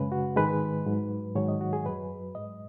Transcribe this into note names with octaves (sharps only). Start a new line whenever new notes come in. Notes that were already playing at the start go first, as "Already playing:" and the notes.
Already playing: F#2 C#3 G#3 B4
F#4
G#2 D#3 G#3 B4
G#2 F#3
G#2 D#3 F#3 C#5
D#5
F#4
G#4
F#2 F#3 B4
G#2 G#3 D#5